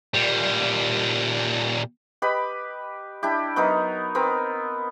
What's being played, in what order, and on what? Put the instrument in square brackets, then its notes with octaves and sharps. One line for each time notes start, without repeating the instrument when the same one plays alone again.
[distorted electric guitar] A#2 G3
[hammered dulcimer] G4 B4 D#5 B5
D4 E4 G4
F#3 B3 D#4 A#4
B3 C4 A#4